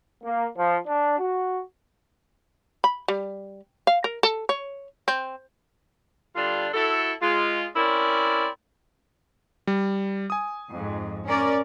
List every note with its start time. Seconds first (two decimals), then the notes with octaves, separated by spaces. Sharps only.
0.24 A#3
0.56 F3
0.87 D4
1.18 F#4
2.84 B5
3.08 G3
3.87 F5
4.04 A#4
4.23 A4
4.49 C#5
5.08 C4
6.35 D3 G3 D4 F4
6.73 E4 F#4 A4
7.22 G#3 F4
7.75 C4 C#4 E4 A#4 D5
9.67 G3
10.30 G#5 D#6
10.70 F2 G#2
11.27 C#4 A#4 D5